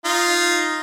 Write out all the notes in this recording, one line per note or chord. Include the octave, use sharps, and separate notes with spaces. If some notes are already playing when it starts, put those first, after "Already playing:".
D#4 F4